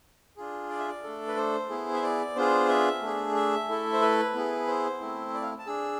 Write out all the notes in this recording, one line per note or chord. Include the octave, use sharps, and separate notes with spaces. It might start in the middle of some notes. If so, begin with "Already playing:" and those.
D4 F4 G#4
D5
E5
D5
A3 D4 A4
B4
C5
B3 E4 G#4
E5
D5
B3 D4 F4 G#4 C5
E5
A3 D4 G#4
E5
A3 E4 A4
C5
B4
B3 E4 G#4
C5
A3 C4 E4
D5
F5
A5
D4 G#4 E6